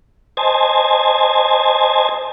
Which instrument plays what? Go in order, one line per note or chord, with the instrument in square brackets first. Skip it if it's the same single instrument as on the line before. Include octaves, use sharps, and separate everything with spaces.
[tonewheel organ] C5 D#5 G#5 A5